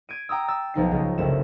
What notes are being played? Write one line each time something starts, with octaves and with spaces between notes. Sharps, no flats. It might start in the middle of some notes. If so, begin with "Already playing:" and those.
G#6 D7 D#7
G5 A#5 D#6 E6
E6 A6
B1 F3 D#4 C7
C#2
F#1 C2 A3 E7